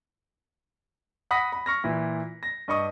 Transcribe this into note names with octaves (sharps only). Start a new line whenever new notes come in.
F#5 B5 D#6 A#6 B6
B5
C#6 F6 A#6
A#2 E3 E4
A#6
G2 D#5 C#6 D#6